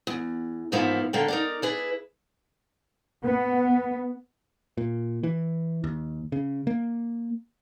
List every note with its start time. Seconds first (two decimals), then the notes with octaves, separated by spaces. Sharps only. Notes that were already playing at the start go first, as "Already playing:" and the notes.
0.07 E2
0.72 E2 G#2 F3 A#3 B3 E4
1.13 D3 A#3 G5
1.28 D#4 A#4 D5
1.62 E4 G#4 B4
3.22 B3
4.78 A#2
5.23 E3
5.84 D#2
6.32 C#3
6.67 A#3